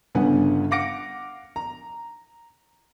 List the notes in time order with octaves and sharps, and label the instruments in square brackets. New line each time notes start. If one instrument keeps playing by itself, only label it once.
[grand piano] G1 G2 C#3 B3 F#5 G#5
F5 F#5 D6 A#6 C#7 D7
A#5